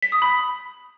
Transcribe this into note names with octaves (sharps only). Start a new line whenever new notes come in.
B6
D#6
B5